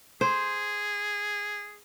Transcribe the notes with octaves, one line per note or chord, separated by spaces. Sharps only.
G#4 C5